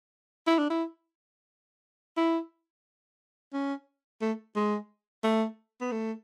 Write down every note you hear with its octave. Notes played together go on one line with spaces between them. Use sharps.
E4
D4
E4
E4
C#4
A3
G#3
A3
B3
A3